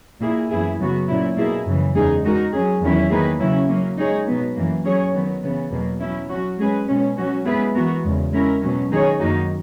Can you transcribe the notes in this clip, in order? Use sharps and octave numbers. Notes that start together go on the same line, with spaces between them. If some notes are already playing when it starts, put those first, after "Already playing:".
A#2 A#3 E4 G#4
F#2 E3 B3 E4 G#4
C#3 F#3 B3 F#4
A#2 F#3 C#4 E4
B2 A#3 E4 G#4
F#2 C#3 E3
E2 C#3 G#3 D#4 G#4
G#3 D#4 F#4 A#4
F#3 C#4 G#4
E2 D#3 F#3 C#4 E4
D#3 A#3 D#4 G#4 B4
C#3 F#3 C#4 E4
F#3 A#3 C#4
G#3 D#4 G#4 C#5
B2 F#3 B3
F#2 E3 A#3
F#3 C#4 G#4 C#5
D#3 F#3 B3
C#3 E3 B3
E2 B2 F#3 A#3
F#3 C#4 E4
F#3 C#4 F#4
G#3 C#4 G#4 B4
B2 G#3 C#4
F#3 C#4 F#4
G#3 B3 E4 G#4 B4
E3 B3 F#4 A#4
E2 C#3 G#3
G#3 C#4 E4 A#4
B2 F#3 C#4
D#3 G#3 D#4 G#4 C#5
F#2 D#3 A#3 D#4 F#4